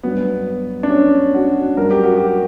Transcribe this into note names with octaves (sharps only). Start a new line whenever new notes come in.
G2 F#3 B3
D4
C#4
F#4
G2 F#3 A#4
G4
F#4
G4